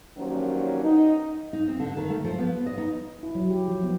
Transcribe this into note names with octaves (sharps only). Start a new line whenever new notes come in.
G2 D#3 F3 F#3 A#3 C#4
D#4
D#4
C4
D3
D#3
A3
F3
B3
D#5
D#4
E4
F#3
G4
F3
B3